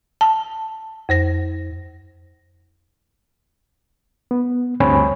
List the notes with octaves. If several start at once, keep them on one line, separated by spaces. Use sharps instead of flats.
A5
F2 C5 A#6
B3
D2 G2 C4 C#5 G#5 B5